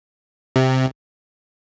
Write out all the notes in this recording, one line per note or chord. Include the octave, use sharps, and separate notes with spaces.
C3